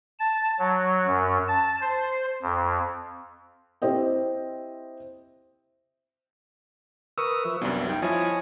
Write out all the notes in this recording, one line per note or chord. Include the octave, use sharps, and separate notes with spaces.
A5
F#3
F#2
A5
C5
F2
C4 E4 G4 C5 D#5 G5
A#4 B4 C#6 D#6 E6
F3 B4 E5
C2 F#2 G3 B3 D4
D#4 G5
F3 E4 C#5 D#5 G#5